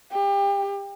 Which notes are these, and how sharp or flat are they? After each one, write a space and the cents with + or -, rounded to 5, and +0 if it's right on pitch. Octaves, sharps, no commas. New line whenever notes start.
G4 +30